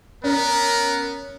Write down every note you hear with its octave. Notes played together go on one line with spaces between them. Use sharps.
B3 C#4 A#4